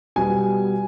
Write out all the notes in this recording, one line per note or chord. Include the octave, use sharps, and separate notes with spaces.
B2 G3 B3 G#5